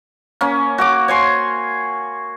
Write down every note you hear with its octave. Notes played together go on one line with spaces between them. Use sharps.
A#3 C#4
F#4 F5 D6
C#5 G#5 C6